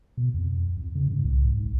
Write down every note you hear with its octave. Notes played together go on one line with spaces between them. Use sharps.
B2
F2
F2
C#3
G#2
C2
G#2
B1